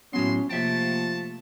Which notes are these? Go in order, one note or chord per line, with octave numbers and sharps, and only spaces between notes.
A2 F#3 B3 C#4 C6
C3 F3 A3 A#3 E5 G5 A5